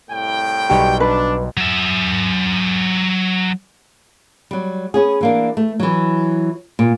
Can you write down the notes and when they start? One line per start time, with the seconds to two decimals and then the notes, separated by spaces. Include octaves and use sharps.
0.11 C2 A2 G5
0.70 B1 G3 G4 C#6
1.00 D4 B4
1.57 F#3 E5
4.51 F#3 G3
4.94 B3 C#4 G#4
5.21 E3 A#3 D4
5.57 A3
5.80 E3 F#3
6.79 A#2